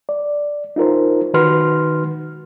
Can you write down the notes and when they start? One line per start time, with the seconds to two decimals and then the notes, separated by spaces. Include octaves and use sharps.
0.09 D5
0.76 D#4 F4 A#4 C5
1.34 D#3 D#4 F#4 B4 C6 F6